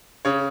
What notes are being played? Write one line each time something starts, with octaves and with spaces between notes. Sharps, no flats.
C#3 C#5